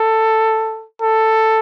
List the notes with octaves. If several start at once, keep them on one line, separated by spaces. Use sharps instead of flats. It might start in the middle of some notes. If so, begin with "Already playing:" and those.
Already playing: A4
A4